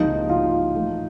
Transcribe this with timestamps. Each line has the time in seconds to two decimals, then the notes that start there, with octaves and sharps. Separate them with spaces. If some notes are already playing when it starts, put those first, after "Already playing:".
Already playing: C#2 C3 F3 A#3 D#4
0.29 F4
0.75 A2 E3 A3